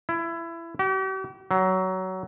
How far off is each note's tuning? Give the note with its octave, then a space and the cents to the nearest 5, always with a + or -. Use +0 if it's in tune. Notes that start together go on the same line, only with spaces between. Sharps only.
E4 +20
G4 -45
F#3 +20